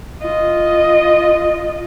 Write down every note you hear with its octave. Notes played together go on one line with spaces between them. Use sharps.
F4 D#5